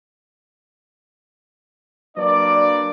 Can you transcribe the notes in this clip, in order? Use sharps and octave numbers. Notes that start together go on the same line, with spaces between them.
F#3 A#3 D4 B4 D5